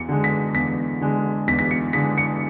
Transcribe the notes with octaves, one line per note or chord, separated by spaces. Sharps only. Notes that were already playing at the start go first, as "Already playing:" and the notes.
Already playing: E2 C#7
D3 G#3
B6
E2 B6
D3 G#3
E2 B6
B6
C#7
D3 G#3 B6
C#7